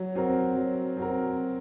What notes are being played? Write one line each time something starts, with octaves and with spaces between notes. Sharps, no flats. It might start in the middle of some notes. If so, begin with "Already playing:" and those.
Already playing: F#3
C4 F#4 A#4
F#3
C4 F#4 A#4